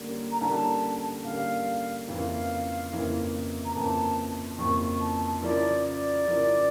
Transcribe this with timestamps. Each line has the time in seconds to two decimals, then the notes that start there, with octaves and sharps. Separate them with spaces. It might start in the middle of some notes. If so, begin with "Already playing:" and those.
Already playing: D3 G3 A#3 C#4
0.32 A#5
0.41 D3 G3 A#3 C#4 A5
1.25 D3 G3 A#3 C#4 F5
2.08 F2 C#3 E3 A#3 E4 F5
2.91 F2 C#3 E3 A#3 E4
3.65 A#5
3.75 F2 C#3 E3 A#3 E4 A5
4.59 F2 C#3 E3 A#3 E4 C#6
5.01 A5
5.43 C#3 F3 C#4 E4 A#4 D5
5.84 D5
6.26 C#3 F3 C#4 E4 A#4